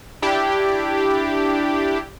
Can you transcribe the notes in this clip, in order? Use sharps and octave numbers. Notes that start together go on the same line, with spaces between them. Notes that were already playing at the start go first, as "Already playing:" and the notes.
D4 E4 G4